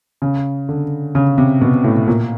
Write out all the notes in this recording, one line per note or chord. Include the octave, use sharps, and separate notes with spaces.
C#3
D3
C#3
C3
B2
A2
A#2